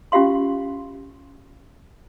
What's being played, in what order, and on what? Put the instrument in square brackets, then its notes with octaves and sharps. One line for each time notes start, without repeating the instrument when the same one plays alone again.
[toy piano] C#4 F4 G4 F5 C6